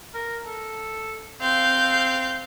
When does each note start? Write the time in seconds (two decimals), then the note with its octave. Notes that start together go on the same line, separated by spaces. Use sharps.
0.14 A#4
0.46 A4
1.41 C4 F5 G6